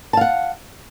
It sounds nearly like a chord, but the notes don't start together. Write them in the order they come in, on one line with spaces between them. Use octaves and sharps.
A5 F5 F#5